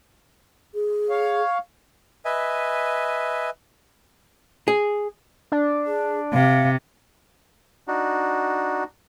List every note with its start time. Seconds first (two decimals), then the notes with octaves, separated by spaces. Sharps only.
0.74 G#4
1.10 C#5 F5
2.25 B4 D#5 E5 G#5
4.68 G#4
5.52 D4
5.86 G#4
6.33 C3 F5
7.88 D4 D#4 F#4